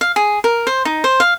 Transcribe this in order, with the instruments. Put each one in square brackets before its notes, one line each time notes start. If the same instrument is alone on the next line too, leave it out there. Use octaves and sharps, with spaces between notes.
[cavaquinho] F5
G#4
A#4
C5
D#4
C5
F5